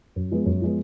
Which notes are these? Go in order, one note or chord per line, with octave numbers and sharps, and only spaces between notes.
F#2
F3 G#3 B3
F#2
F3 G#3 B3